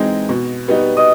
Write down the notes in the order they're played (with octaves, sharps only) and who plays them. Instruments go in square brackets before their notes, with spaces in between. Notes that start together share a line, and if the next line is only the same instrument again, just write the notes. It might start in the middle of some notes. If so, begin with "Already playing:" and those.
Already playing: [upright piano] E3 G#3 C4 D#4
B2
G3 B3 D#4
[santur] D#5